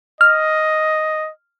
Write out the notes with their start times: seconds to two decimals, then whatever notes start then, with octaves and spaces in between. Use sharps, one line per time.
0.21 D#5 F6